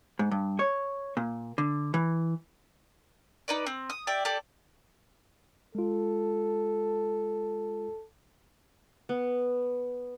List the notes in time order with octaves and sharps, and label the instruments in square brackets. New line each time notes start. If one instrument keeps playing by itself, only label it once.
[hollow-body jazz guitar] G#2
G2
C#5
A#2
D3
E3
[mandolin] D#4 B4 D5
C4
D#6
G4 D5 E5 G5
G4 A4 D5
[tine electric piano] G#3 F4 [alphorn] A4
[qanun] B3